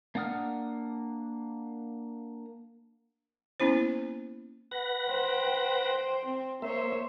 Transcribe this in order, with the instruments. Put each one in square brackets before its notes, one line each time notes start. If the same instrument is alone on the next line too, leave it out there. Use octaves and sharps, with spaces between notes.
[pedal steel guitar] A#3 D4 F#5 D#6 F6
[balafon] A#3 B3 C#4 E4 C5
[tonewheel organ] B4 F#5 A#6
[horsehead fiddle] C5 G5
C4
[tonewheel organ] A#3 E5 [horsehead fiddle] C5 C#5